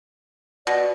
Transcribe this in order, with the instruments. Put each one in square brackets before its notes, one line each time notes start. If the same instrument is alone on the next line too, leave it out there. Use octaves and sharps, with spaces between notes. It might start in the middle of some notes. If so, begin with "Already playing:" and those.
[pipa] B2 [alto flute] D5